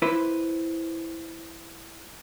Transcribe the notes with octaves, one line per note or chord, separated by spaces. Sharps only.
E4 B4 C5